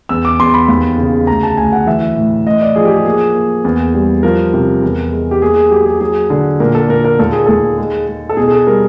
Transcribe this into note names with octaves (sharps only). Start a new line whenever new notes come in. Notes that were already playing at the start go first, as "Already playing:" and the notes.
E2 E6
D6
E2 C6
B5
D#2
C#3
D2 A#5
A5
D2 G#5
F#5
E3 E5
A2
A2 D#5
D5
F3 G#4
G4
G#4
G4
A#3 G#4
A#3
E2
G3
F3 A#4
C3
E2
G#3
G4
A#3 G#4
G#4
F#3 G4
G#4
F#3 G#4
D3
A#2 A#4
A4
A#2 A#4
A#4
D#2 A4
G#4
D#2 A4
G#3
G#3
A4
B2 G#4
G#4
A4
G3 A#4